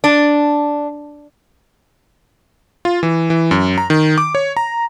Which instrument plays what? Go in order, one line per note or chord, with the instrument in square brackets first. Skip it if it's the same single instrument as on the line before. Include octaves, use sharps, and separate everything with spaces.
[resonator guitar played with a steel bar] D4
[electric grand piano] F4
E3
E3
F#2
A#5
D#3
D6
C#5
A#5